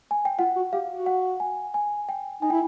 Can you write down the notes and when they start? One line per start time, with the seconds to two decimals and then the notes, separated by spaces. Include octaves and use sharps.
0.11 G#5
0.25 G5
0.39 F4 F#5
0.56 F#4
0.73 G4 F5
0.90 F#4
1.06 F#5
1.40 G#5
1.74 G#5
2.09 G5
2.42 D#4 G#5
2.50 E4 G5